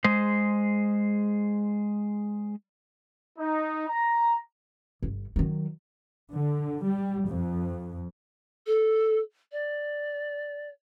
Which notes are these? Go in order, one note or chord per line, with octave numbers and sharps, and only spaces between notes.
G#3 G#4 C5
D#4
A#5
G1
D#3 F#3
D3
G3
F2
A4
D5